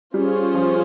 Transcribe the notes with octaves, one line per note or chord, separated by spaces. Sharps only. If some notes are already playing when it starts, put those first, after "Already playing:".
G3 C#4 F4 G#4 C5
F3